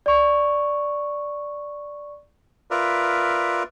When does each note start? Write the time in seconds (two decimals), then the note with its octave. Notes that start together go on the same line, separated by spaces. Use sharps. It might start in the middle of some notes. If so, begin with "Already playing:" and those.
0.06 D5 C#6
2.71 F4 A#4 B4 D5 E5